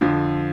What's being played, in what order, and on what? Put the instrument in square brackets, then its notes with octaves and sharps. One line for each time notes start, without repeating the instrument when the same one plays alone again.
[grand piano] F2 D3 F3